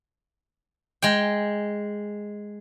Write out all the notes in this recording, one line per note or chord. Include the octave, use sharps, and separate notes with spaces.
G#3 G5